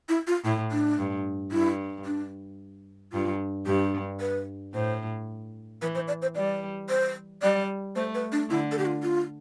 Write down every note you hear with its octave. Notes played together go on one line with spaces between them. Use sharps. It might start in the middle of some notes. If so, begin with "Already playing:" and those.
E4
F4
A2 E4
D4
G2
G2 E4
D4
G2 F4
G2 G4
B4
A2 C5
E3 B4
C5
D5
C5
G3 D5
C5
G3 D5
A3 C5
B4
D4
D3 E4
A4
G4
F4
F4